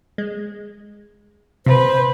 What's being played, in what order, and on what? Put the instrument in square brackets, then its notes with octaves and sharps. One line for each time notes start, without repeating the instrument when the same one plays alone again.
[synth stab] G#3
[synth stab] C3 [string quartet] B4 [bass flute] C5